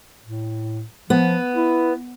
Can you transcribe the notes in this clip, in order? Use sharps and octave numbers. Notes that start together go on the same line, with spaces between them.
A2
F3 B3
E4